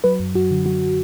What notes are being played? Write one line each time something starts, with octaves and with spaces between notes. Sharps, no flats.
F#3 B4
F#2
F#2 F#4
D3
F#3 F#4